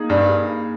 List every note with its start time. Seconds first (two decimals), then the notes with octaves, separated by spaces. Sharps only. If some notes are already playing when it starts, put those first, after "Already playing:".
Already playing: A#3 D#4 G#4
0.10 G2